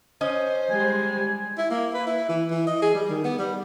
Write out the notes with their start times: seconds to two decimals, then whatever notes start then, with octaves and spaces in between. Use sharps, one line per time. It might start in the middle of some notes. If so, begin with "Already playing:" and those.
0.21 C#4 C5 D#5
0.70 G3 G#3 G#5
1.58 E4
1.71 A#3
1.94 B4
2.07 E4
2.29 E3
2.50 E3
2.67 D#5
2.82 G#4
2.94 G3
3.09 D#3
3.24 B3
3.39 G3